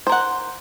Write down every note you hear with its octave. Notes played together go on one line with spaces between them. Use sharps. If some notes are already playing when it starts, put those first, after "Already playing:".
A#4 C5 F#5